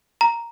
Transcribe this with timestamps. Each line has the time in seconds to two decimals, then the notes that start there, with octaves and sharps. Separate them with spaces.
0.21 A#5